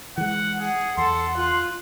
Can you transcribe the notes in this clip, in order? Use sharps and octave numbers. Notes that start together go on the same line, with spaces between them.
E3 G#3 F#5
G#4 F#5
E2 A4 C6
F4 F#6